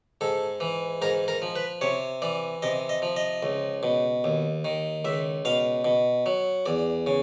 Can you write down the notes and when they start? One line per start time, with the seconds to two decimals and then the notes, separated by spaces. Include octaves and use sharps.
0.21 G#2 A4
0.60 E3
1.02 G#2 A#4
1.28 A#4
1.42 F3
1.56 B4
1.81 C3 C#5
2.22 E3 D5
2.62 C3 D#5
2.89 D#5
3.02 F3
3.16 D#5
3.43 C#2
3.83 B2
4.24 D#2
4.65 D#3
5.05 C#2 E5
5.45 B2 F5
5.85 B2
6.26 F#3
6.66 E2 D5
7.07 C#3